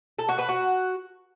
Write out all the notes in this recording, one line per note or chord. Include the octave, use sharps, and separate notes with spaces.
A4
F#4
B4
F#4